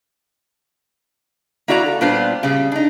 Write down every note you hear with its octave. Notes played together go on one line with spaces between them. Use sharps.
A#3 E4 F#4 D5 D#5 A#5
A4
A#2 G3 B3 D4 F4 C5
C#3 G3
D4 D#4